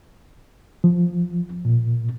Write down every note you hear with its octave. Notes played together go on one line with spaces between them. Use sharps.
F3
A#2